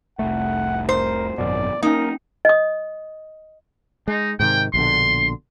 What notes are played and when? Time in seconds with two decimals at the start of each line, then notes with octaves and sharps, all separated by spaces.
0.19 F1 C2 A3 F#5
0.89 A#4 C5
1.38 G#1 F#2 B2 D5
1.83 A#3 C#4 D#4 A#4
2.45 D#5 D#6
4.08 G#3 D#4
4.40 G#2 C3 D#3 G5
4.74 A#1 B2 D3 C6